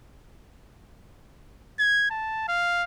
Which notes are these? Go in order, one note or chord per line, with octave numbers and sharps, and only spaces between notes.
G#6
A5
F5